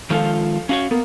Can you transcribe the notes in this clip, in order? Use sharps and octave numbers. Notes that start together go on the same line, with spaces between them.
D#3 F3 G#3 F4 A4 F5
C#4 F#4 C#5 F5
A#3 B3